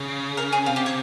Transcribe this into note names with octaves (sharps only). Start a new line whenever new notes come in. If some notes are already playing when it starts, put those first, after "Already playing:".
Already playing: C#3
A#4
G#4
C3 F4
G4
C#5